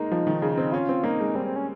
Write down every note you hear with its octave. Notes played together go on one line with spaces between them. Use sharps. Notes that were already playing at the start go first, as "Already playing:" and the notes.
Already playing: G#3 A#3 D#4
F3
D#3
C#3
C4
C#4 F4
C4
A#3 D#4
G#3
G3 C4
C4
C#4